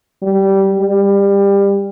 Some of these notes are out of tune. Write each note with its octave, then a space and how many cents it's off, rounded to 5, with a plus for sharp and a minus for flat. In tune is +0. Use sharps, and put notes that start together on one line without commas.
G3 -15
G3 +20